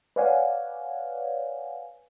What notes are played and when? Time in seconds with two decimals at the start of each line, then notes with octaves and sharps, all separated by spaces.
0.16 B4 C#5 D5 F5 F#5 G#5